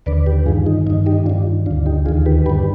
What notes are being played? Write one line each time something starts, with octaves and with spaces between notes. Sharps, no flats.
D#2 D3 B4 D5
G4 B4
G2 D#3 F4 G#4
D#4
G2 D#3 D#4
D#4 G4
G2 D#3 D4 F4
D2 D3 D4 F4
D#4 G4
D#2 D#3 F4 G#4
G4 B4
G2 D3 G4 B4